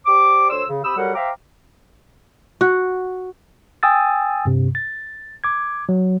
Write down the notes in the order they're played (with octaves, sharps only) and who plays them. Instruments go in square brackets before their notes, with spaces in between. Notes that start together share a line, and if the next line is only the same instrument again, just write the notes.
[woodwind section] G4 C5 D5 D6
D2 C5 C#5 C6 E6
C#3
C3 G4 B5 D#6 E6
F#3 G3 G4 A4 A#4 F#5
C5 E5 F5 G5 A#5 D6
[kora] F#4
[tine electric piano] G5 G#5 D#6 E6 A6
G2 C3
A6
D6 G#6
F#3